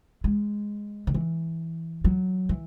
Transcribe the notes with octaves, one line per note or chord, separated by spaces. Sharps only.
G#3
D#3
E3
F#3
E3